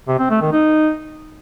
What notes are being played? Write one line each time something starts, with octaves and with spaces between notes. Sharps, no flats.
C3
C4
A3
D#3
D#4